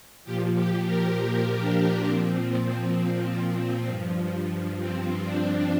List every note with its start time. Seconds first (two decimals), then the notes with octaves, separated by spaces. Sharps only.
0.25 A#2 F3 G4
0.55 G4
0.86 A#4
1.16 G4
1.61 D4
2.06 A#2 F3 C4
3.88 G2 F3
4.79 C4
5.24 D4